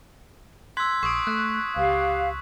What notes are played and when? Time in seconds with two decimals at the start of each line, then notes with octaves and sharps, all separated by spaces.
0.77 C6 E6 F#6 G#6 B6
1.03 A#1 C#6 D#6 C7 D7
1.27 A3 F#6
1.76 C#2 G4 F5